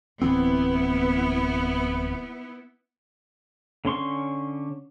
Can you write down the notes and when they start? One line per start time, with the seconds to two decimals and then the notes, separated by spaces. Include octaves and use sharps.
0.22 D1 E3 B3 C4 E4
3.85 D3 C#4 C6 C#6